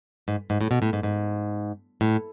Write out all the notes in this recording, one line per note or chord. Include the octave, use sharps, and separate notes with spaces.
G#2
G#2
A2
B2
A2
G#2
G#2
A2